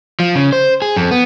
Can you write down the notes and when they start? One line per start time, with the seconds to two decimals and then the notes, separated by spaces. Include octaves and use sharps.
0.20 F3
0.35 C#3
0.53 C5
0.82 G#4
0.96 F2
1.11 B3